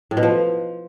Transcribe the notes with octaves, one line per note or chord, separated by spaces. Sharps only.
A2
B2
F3